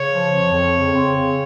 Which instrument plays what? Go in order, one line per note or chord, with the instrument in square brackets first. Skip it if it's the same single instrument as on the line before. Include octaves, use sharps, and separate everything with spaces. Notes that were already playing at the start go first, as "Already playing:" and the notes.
Already playing: [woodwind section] C#3 [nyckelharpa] C#5
[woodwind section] F3
F2
F2
C#3
C4
C#3